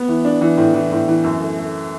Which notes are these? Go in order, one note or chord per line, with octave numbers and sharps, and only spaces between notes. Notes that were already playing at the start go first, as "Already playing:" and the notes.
Already playing: B3
E3
D4
E3
A2
E3
A2
E3
F#2
A3
A3